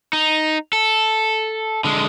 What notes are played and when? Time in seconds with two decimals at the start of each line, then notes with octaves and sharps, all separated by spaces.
0.13 D#4
0.73 A4
1.84 D3 G#3